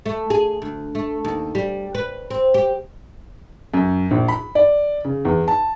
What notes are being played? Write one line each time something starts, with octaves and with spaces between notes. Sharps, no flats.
A3
G#4
D2
A3
D#2
G3
B4
C4
G4
F#2
A#1
B5
D5
C#3
E2
A5